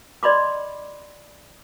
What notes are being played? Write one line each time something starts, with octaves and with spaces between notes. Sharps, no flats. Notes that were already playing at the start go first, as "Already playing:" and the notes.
D5 D#5 B5 C6 D6